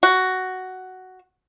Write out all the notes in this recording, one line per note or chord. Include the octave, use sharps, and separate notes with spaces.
F#4